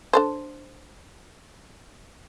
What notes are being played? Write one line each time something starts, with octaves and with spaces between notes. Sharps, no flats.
D4 A4 C5